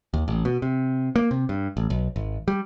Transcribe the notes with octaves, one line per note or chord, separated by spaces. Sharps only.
D#2
A1
B2
C3
A#3
C3
G2
A1
B1
G#1
G3